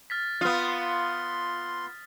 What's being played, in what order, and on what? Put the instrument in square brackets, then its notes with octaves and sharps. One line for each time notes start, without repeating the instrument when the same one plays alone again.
[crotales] F6 A6 B6
[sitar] B3 F4 [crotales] D#6 F6
[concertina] C6